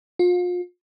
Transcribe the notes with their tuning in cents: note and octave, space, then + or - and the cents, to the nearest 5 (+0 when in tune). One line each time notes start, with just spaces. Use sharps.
F4 +35